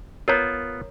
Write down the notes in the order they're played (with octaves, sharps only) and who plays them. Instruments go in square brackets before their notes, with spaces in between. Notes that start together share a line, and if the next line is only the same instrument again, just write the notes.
[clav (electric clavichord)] B3 F4 [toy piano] A#4 C#5 A#5